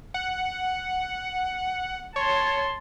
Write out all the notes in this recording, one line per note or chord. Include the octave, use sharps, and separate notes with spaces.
F#5
C#5 A5 C6